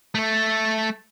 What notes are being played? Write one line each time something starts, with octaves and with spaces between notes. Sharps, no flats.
A3 A4